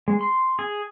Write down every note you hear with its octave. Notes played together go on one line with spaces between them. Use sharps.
G#3
C6
G#4